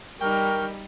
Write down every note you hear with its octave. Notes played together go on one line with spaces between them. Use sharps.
G3 D#4 A#4 G5 C#6 F6